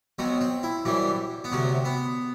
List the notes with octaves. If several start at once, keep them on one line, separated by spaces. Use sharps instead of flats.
B1 B2 F#3 C4
C4
E4
F#2 E3 G3 C4
B3
D2 C3 F#3 C4
B3